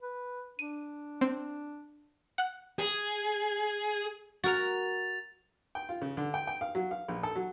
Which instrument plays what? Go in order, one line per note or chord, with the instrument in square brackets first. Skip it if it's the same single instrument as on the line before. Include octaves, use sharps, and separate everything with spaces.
[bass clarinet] B4
[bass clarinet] D4 [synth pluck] D#7
[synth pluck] C4
F#5 F#6
[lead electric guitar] G#4
[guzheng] F#4 A#4 [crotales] A6 F7
[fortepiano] G5
F4
C#3
D3
G5
G5
F5
F#3
F5
A#1
A4
F#3